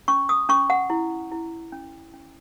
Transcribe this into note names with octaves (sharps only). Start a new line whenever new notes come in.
C#4 C#6
D#6
C#4 C#6
F#5
E4
E4
C#4
C#4